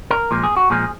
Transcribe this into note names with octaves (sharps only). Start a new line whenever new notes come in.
A#4
A#2 F3 G#3
G#4
F#4
A#2 F3 G#3 G#4